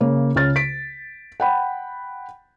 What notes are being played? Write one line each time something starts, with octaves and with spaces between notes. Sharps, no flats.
C#3 A#3
C#2 C#3 F6 A6
B6 D7
F#5 G5 B5